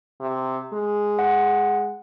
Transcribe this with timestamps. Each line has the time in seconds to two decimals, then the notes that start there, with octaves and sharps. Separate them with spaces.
0.21 C3
0.73 G#3
1.19 F#5